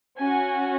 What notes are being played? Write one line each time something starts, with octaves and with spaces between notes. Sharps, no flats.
C#4 F#4 G#5